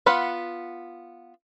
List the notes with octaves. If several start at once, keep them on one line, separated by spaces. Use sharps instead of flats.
B3 F4 B4 F#5